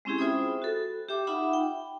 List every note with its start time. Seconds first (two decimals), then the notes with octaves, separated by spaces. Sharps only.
0.05 G#3 C4 C#4 E4 G4 G#4
0.18 F4 C5 E5 G5 B5 D#6
0.62 F#4 A4
1.08 G4 E5 G5 D6
1.27 D#4 F4 E5 F#5 B5 D6
1.53 G5